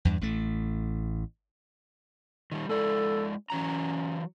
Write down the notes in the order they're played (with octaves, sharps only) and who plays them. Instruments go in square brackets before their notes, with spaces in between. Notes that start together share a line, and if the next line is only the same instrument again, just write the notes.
[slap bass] E2 G2
A1 A3
[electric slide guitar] D#3 G3
[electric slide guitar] G#3 E4 D5 [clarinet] A4
[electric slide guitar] E3 F#3 A#5 [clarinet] C#4